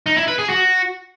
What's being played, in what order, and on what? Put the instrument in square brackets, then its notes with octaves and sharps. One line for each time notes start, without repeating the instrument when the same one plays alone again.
[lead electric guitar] D#4
E4
B4
G#4
F#4